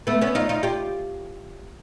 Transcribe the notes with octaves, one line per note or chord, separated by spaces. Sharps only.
A3 B3
B3 C#4
D#4 F4
D#4 F4
F4 G4